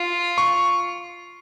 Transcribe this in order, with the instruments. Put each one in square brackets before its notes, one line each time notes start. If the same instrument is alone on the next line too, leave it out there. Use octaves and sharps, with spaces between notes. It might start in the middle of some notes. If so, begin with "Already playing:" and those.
Already playing: [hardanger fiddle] F4
[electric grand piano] C#6